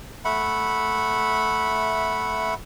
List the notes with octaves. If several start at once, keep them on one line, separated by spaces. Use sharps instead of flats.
A3 E5 F#5 B5